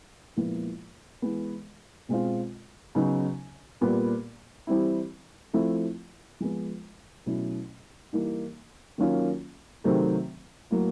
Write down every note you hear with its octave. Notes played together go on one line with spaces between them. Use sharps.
A#2 F3 G#3 B3 E4
E3 G#3 B3
B2 G#3 C4 F4
C#3 F#3 B3 D#4
A#2 G3 B3
E3 G3 C4 E4
F3 A3 C4 E4
F3 G#3 B3
B2 F#3 A3 C#4 E4
E3 G3 A#3 D#4
D#3 F#3 A#3 C#4 F4
C3 D#3 F#3 A3 C4
A2 F#3 A#3